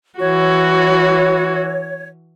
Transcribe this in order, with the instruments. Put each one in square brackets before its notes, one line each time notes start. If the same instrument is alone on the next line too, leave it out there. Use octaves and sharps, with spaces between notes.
[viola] E3 F#4 [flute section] C#5